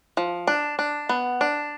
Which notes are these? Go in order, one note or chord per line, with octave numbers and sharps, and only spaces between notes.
F3
D4
D4
B3
D4